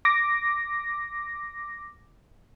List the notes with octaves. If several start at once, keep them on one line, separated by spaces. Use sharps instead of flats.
D6 A#6